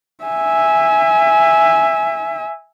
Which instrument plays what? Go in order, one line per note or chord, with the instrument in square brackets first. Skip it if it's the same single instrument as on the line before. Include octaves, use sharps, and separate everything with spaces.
[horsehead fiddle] E5 G#5